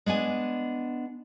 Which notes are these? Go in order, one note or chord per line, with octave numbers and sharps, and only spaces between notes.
G#3 B3 D4 G#5